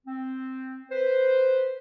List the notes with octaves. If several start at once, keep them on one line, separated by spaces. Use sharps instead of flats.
C4
B4 C5